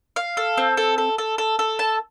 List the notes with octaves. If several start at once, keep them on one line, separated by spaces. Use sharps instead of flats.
F5
A4
C4
A4
A4
A4
A4
A4
A5